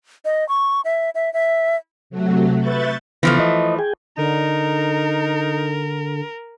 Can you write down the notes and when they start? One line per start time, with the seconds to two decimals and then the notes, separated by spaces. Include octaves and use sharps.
0.25 D#5
0.49 C#6
0.85 E5
1.15 E5
1.33 E5
2.10 C3 F#3 A3 F#4
2.59 B4 E5 C#6 F#6 G6 A6
3.23 C#3 E3 F3 A3 B3
3.39 D#5
3.79 G#4 G5 G#5
4.17 D3 D#4 A#4